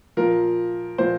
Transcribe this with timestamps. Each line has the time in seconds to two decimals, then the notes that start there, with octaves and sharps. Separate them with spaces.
0.17 A#2 F3 A#4
0.98 A#2 F3 C5